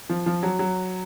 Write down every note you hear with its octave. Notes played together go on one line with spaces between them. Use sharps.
F3
F3
F#3
F#3